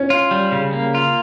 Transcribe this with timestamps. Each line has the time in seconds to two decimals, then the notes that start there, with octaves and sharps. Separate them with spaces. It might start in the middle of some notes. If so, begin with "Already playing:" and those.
Already playing: C#4
0.10 F4
0.31 G3
0.52 C#3
0.73 A#3
0.95 F4